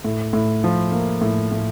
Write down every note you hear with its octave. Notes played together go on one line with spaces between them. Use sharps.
A2
A2
F3
A#3
A2
A2